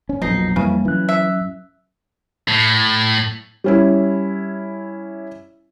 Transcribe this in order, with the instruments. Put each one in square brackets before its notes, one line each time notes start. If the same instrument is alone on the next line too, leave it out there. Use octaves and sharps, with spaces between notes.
[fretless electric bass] C#4
[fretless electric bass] A#1 F2 B2 [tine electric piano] F#3 A#6 C7 [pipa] D#4
[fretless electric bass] F2 E3 [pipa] C#3 [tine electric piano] G3 A#3
[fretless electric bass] E3 [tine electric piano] F#3 C#4 F#6
[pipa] E5
[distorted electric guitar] A2
[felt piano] G3 C#4 E4